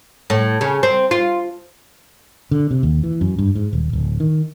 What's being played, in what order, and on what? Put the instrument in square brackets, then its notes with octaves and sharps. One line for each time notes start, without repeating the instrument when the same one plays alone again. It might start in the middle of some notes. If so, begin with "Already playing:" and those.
[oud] A2
C#3
C4
F4
[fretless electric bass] D3
C3
D#2
E3
F#2
G2
G#2
D#1
D1
D#3